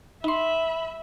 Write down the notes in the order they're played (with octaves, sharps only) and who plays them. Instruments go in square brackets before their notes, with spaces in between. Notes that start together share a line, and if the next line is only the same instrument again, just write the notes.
[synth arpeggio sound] D#4 C6 [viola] E5 [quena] B5